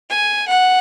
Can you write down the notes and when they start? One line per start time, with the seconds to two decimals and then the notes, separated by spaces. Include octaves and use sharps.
0.10 G#5
0.48 F#5